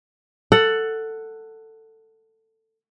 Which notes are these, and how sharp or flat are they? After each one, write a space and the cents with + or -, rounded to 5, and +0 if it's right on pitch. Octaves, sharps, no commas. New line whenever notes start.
A4 +15 F#5 +5